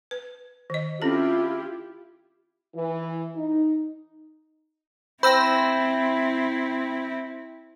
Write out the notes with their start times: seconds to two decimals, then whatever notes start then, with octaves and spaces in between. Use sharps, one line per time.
0.11 B4
0.70 D#3 D#5
1.02 C4 C#4 E4 F4 G4 A4
2.75 E3
3.36 D#4
5.23 C4 E4 C5 G5 B5 E6 A#6